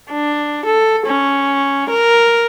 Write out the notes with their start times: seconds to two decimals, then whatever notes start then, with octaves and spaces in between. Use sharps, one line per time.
0.11 D4
0.66 A4
1.07 C#4
1.90 A#4